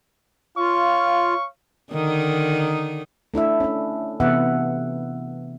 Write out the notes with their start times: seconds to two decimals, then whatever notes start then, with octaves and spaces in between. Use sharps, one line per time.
0.58 F4 C#5 F5 C#6
1.92 D3 D#3 D#4
3.34 A3 D4 E4 E5
3.60 C#4 D4
4.20 C3 E3 B3 E5 F#5